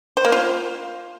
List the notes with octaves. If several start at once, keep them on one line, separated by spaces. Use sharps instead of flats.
C5
A#3
F4